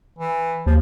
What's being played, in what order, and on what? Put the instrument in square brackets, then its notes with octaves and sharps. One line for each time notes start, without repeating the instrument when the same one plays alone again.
[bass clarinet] E3
[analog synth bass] D#2 [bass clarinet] F3